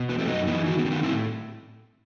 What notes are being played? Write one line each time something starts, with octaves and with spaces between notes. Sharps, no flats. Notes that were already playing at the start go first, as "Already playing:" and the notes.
Already playing: B2
E2 B3
A3 C4
F#2 B3 D#4
E3 B3 D#4
D#3 D#4 F#4
B3
D#3 C4
B3 D#4
A2 C4 E4